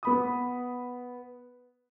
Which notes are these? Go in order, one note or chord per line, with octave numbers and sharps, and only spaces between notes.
B3 B5 D#6